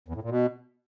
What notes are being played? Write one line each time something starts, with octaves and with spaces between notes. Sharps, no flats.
E2
A2
A#2
B2